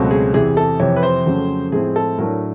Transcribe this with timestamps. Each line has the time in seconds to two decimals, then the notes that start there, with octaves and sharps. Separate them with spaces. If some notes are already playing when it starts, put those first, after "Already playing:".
Already playing: C#2 B2 F#3 A3 C4
0.11 G#4
0.34 E2 C3 E3 G#4
0.57 A4
0.80 F2 C3 E3 C#5
0.96 B4
1.03 C5
1.26 F2 C#3 F#3 A3 C#4
1.72 A2 F3 G#3 C4 E4 G#4
1.96 A4
2.18 A2 F#3 A3 D4 A#4